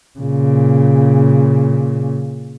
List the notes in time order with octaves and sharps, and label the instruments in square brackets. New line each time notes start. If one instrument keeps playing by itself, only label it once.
[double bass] A#2 C#3